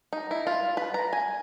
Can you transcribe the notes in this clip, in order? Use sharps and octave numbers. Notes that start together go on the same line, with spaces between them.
D#4
E4
F4
B4
A#5
G#5